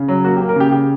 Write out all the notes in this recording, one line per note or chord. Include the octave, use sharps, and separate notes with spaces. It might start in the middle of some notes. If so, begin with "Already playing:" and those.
Already playing: C#3
F#3
A#3 F#4
G4
A#3
A#4
C#3 G4
C#3 G4